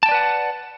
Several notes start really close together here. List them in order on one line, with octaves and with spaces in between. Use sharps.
A5 G5 D5 B4 F#5